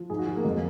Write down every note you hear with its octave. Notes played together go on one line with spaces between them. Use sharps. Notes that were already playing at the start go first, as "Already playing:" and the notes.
Already playing: F3
G#2 G#4
F#4
F3
A#3
F2 G#3